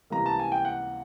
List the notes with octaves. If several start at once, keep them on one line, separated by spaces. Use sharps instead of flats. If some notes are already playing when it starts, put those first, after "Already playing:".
C#2 C3 E3 G3 A#3 A#5
A5
G#5
G5
F#5